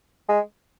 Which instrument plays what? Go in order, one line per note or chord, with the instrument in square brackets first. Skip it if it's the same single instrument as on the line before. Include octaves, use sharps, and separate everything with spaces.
[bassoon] G#3